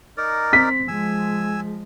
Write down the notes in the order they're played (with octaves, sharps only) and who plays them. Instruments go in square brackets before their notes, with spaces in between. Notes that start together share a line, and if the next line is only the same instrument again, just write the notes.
[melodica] D#4 A#4 D5
[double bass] C4 [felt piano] B6
[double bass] F3 G#3 [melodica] G#5 E6